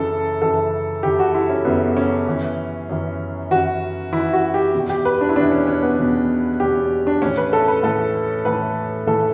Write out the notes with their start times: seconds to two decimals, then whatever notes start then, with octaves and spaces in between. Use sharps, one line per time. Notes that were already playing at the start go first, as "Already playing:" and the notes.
Already playing: F#2 C#3 E3 A4
0.42 F#2 C#3 E3 A4
1.03 F#2 C#3 E3 G4
1.19 F#4
1.35 E4
1.49 C#4
1.65 F#2 C#3 E3 B3
1.97 C#4
2.27 F#2 E3
2.89 F#2 E3
3.51 F#2 E3 F#4
4.12 F#2 E3 E4
4.33 F#4
4.54 G4
4.74 E2 B2
4.90 G4
5.05 B4
5.21 D4
5.29 E4
5.36 E2 B2 D4
5.52 C#4
5.67 C#4
5.83 B3
5.98 E2 B2
6.60 E2 B2 G4
7.07 D4
7.22 A2 E3 C#4
7.37 B4
7.53 A4
7.68 B4
7.83 A2 E3 A4
8.45 A2 E3 B4
9.07 A2 E3 A4